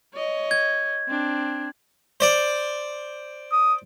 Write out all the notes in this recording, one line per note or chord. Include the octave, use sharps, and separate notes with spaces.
C#5 D#5
G#6
C4 D4
C5 D5
D#6